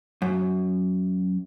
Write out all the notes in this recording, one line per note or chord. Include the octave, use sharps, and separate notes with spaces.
F#2